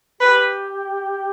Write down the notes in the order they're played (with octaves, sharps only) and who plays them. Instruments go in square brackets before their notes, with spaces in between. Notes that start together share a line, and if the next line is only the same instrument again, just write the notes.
[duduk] G4 [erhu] B4